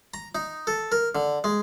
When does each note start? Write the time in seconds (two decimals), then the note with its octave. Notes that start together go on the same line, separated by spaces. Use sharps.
0.14 A#5
0.35 D#4
0.67 A4
0.92 A#4
1.15 D3
1.44 G#3